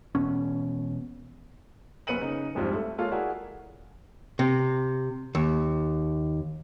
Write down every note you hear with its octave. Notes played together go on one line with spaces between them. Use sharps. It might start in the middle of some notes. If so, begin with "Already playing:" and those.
E1 E2 B2 C#4
F#1 B3 B4 C#7 D#7 F#7
C#3 D#4
A#1 F2 G#2 G3 F4
A3 A4
G#3 A#3 F4 A4 C#5 F5
E4 F#4 G#4 A#4 D5 E5
C3
D#2